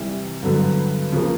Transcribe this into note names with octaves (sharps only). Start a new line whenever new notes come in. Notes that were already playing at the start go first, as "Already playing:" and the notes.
Already playing: C3 E3 G3
G2 D3 F#3 B3
C#3 F3 A#3